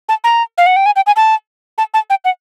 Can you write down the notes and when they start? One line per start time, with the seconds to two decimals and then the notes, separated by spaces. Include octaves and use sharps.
0.09 A5
0.24 A#5
0.58 F5
0.66 F#5
0.76 G5
0.86 G#5
0.96 G5
1.07 G#5
1.16 A5
1.78 A5
1.94 A5
2.10 G5
2.25 F#5